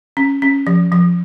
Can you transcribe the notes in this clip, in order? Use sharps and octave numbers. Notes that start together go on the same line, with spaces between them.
C#4
C#4
F3
F3